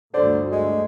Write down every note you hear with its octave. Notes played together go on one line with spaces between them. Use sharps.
G1 D2 D3 C5 D5
G#3